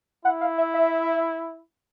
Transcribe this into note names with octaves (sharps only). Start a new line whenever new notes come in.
E4 F#5
F5
E5
E5